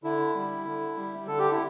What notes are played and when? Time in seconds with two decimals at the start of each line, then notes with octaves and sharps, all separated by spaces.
0.04 D3 E4
0.34 G3
0.65 D3
0.96 G3
1.26 D3 A4
1.39 G4
1.51 E4